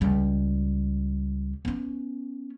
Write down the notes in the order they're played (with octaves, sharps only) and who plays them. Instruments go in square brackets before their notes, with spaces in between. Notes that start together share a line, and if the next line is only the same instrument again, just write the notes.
[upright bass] C#2 G3
B3 C#4